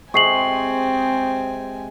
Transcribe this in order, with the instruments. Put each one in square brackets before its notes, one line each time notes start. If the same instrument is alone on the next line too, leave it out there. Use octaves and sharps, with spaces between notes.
[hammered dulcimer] C3 G#3 G#4 [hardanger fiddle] C4 G#5 [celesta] C#6 C7 F#7